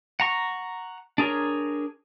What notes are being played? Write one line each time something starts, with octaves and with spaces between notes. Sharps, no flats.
F#5 A#5 C#6
D4 G#4 A#4 C#5